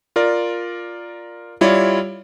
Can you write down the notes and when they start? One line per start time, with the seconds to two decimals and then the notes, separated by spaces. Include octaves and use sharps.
0.16 F4 A#4 D5
1.61 G3 E4 F4 C#5 D5